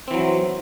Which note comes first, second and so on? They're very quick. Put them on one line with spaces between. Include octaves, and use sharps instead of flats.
C4 E3 F#3